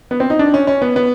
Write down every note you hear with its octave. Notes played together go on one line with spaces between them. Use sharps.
B3
C4
D#4
D4
C#4
C#4
B3
B3